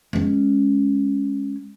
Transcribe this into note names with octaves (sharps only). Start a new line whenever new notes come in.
G#3 C#4